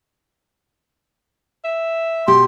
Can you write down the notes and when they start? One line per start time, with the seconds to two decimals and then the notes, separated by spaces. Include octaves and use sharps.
1.64 E5
2.28 B2 G4 C6